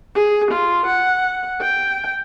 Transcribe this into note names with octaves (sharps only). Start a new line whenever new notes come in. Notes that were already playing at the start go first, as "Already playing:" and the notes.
G#4
F4
F#5
G5